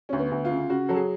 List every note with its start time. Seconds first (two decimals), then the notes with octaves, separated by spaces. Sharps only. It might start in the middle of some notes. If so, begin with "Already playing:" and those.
0.09 D2 C#4
0.20 B3
0.31 D2
0.45 F4
0.51 C#3
0.70 C#3 F#4
0.89 F#3 A4
0.96 G#4